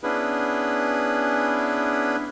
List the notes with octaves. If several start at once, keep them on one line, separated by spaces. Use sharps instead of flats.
B3 C#4 D4 E4 G#4 B4